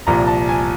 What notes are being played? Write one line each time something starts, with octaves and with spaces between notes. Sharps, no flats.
C2 A#2 F3 A#5
A5
G#5